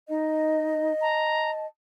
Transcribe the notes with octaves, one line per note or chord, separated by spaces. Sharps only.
D#4 D#5
A5 A#5